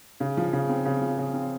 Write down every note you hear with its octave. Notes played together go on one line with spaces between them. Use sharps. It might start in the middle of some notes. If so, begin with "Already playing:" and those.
C#3
F3
C#3
C4
C#3
F3
C#3
C4